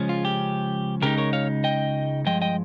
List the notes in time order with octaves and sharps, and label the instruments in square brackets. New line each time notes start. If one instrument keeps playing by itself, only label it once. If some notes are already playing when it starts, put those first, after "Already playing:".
Already playing: [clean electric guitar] C#3 F3 G#3 C#4
F4
G4
C#2 C#3 G#3 C4 D#4 G4 A#4
A#4 C#5
C#5 F5
D#5 G5
G2 F3 G#3 D#5 G5
D#5 G5